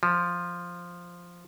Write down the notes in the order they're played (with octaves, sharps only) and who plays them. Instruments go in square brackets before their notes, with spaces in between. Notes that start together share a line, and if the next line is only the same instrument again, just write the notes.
[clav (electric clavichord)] F3